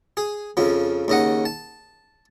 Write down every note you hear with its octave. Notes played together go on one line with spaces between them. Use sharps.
G#4
F2 C#3 F3
D#2 C#3 D#5 F#5
A5